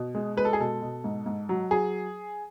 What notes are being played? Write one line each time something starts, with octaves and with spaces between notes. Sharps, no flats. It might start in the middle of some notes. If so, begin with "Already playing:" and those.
Already playing: B2
G#3
G#3 B4
A4
G#4
B2 A4
B2
G#2
G#2
F#3
F#3 G#4